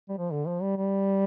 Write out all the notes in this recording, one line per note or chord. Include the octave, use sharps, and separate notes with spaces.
G3
F3
D3
F3
G3
G3